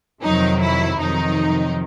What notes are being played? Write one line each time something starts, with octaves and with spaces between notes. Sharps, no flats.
F2 C3 D#3 F#3 D#4
E4
F2 C3 D#3 F#3 D#4